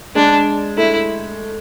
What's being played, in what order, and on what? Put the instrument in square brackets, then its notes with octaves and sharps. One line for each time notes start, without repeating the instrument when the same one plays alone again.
[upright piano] G#3 [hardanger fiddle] D4
[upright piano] A3 [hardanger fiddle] E4